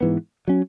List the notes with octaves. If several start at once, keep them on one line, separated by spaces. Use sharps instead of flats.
G#2 E3 B3
F#3 C#4